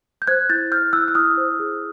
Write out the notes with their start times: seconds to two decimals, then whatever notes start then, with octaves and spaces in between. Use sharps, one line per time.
0.22 G6
0.27 C5 F#6 G#6
0.49 E4 G6 A6
0.71 C5 F6 G6
0.93 E4 E6 F#6
1.08 E6
1.15 E4 D#6 F6
1.37 C5
1.60 G#4